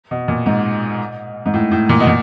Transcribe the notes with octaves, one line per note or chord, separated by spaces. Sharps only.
B2
A#2
G#2
G#2
A2
A2
A#2
B2
A#2